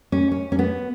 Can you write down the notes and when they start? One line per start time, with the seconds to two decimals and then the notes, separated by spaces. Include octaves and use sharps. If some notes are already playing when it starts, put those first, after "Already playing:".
0.12 C#4
0.31 C#4
0.52 C#4
0.59 B3